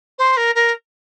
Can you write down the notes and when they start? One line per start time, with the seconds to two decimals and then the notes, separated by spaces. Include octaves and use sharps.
0.18 C5
0.37 A#4
0.55 A#4